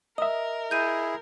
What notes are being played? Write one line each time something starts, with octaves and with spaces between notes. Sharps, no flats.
A#4 D#5 E5 D#6
E4 G#4 G6 D#7